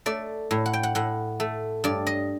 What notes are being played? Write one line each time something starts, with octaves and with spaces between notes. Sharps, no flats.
A3 D5
A2
F#5
G5
F#5
A2 F#5
A3
G2 D5
D#5